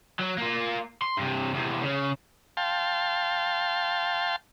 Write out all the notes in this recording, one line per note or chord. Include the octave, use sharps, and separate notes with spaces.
F#3
A#3 F4
C6
G2 C3
E2 C3
C#3
F5 G5 A5 C6